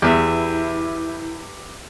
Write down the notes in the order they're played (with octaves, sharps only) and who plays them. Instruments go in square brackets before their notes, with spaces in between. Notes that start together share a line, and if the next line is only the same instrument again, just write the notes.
[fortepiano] E2 [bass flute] E4 [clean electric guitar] G4 B4 E5